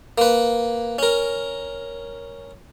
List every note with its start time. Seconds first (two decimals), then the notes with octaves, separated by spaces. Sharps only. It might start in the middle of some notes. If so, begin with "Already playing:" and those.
0.18 A#3 B4
0.99 C#4 A#4